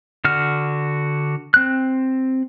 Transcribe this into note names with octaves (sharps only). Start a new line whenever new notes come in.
D3 F#4 F6
C4 F#6